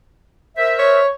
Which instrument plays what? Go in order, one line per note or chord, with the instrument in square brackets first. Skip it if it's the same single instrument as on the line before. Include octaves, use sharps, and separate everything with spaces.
[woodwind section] A#4 C5 E5
[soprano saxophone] C#5